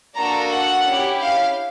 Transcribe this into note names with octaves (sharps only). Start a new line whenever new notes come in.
A#3 D4 F#4 A4 A#5
F#5
C#4 E4 G4
F5